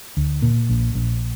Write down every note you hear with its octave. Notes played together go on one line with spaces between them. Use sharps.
D2
A#2
A#1
A#1